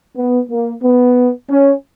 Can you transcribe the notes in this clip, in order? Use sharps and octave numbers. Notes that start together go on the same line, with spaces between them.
B3
A#3
B3
C#4